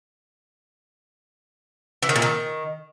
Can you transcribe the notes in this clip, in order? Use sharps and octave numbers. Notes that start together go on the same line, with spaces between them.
E3
D#3
A#2
D#3